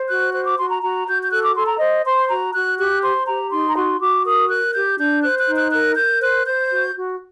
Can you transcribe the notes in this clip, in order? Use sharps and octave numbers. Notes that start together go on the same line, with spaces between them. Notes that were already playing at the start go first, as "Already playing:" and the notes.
Already playing: C5
F#4 F#6
C5 F#6
D6
F#4 C6
A#5
F#4 A#5
F#4 G6
G6
A4 F#6
D6
A4 C6
A#5
C5 D#5
C5 C6
F#4 A#5
F#4 F#6
G4 F#6
C5 C6
G4 A#5
D#4 C6
A#5
F#4 C6
F#4 D6
A#4 D#6
A#4 F#6
G4 G6
D4 G6
C5 F#6
F#6
D#4
F#6
A#4 F#6
A#4 G6
C5 F#6
C5 G6
F#4
F#4